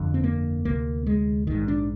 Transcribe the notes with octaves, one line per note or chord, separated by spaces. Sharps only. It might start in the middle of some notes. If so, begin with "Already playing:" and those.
Already playing: G1 F2 D3
C4
A#3
D2 C3 A#3
G#3
A#1 G#2 D#3
D4